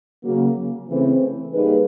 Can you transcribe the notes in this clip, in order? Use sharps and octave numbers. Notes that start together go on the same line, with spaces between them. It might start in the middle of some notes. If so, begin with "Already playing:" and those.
C#3 F#3 A#3
C#3 E3 A3 C4
G3 A#3 D#4 G#4 B4